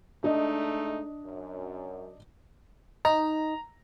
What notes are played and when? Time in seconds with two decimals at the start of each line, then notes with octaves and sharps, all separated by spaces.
0.24 G#3 A3 D4 D#4 D#5
1.26 F#2
3.05 D#4 A#5